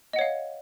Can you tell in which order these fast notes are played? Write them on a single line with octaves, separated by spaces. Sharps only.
D#5 F#5 C#5 F5